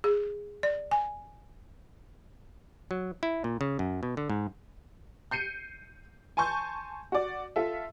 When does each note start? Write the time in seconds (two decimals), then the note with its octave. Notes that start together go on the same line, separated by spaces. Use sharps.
0.04 G#4
0.63 D5
0.91 G#5
2.91 F#3
3.23 E4
3.44 A#2
3.61 C#3
3.79 F#2
4.03 B2
4.17 D3
4.30 G#2
5.31 G6 C7 C#7 D#7
6.37 G#5 A5 C6 C#6 G6
7.12 F#4 D5
7.56 F4 A4 E5